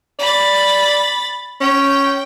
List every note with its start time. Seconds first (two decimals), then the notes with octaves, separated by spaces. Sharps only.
0.19 D5 B5 A6
1.61 C#4 G5